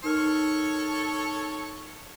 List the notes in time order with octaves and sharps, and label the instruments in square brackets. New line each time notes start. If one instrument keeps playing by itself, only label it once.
[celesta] D#4 A#4 F6 [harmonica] A4 C#5 C#6